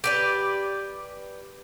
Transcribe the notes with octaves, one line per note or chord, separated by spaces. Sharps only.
G4 B4 D5